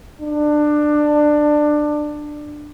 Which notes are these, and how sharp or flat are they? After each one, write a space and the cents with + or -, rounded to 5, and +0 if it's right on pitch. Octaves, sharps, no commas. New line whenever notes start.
D4 +20